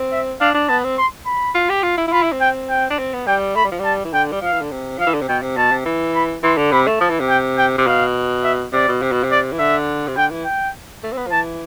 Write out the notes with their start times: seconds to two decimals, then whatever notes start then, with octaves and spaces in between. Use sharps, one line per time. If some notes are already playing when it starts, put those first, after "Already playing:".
Already playing: C4
0.12 E5
0.41 D4 F5
0.54 D4
0.69 B3 A5
0.84 C4
0.98 C6
1.26 B5
1.55 F4
1.70 G4
1.83 F4
1.98 E4
2.08 E4
2.12 F4 B5
2.23 E4
2.32 C4
2.41 G5
2.70 G5
2.90 D4
2.99 C4
3.13 B3
3.27 G3 G5
3.56 A3 B5
3.64 G3
3.72 F3
3.79 G3
3.85 A5
4.05 E3
4.13 D3 G5
4.32 G3
4.42 F3 F5
4.52 E3
4.61 D3
4.71 C3
4.99 F3 F5
5.07 E3
5.15 D3
5.21 C3
5.29 B2 G5
5.42 C3
5.57 B2 A5
5.72 C3
5.85 E3
6.15 B5
6.43 E3 C6
6.58 D3
6.72 C3 B5
6.87 A3
7.00 F3 A5
7.10 E3
7.20 C3
7.29 G5
7.58 G5
7.78 C3
7.87 B2 F5
8.44 E5
8.73 C3 D5
8.88 B2
9.02 C3
9.12 B2
9.24 C3
9.31 D5
9.52 E3
9.59 D3 E5
10.08 C3
10.17 D3 G5
10.31 E3
10.45 G5
11.04 A3
11.13 C4
11.17 B3
11.27 F3
11.32 E3 A5